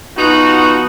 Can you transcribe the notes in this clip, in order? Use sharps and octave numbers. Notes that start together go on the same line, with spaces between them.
F3 B3 D#4 F#4